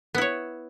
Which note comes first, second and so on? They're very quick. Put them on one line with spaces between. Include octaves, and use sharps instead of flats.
B3 E4 C#5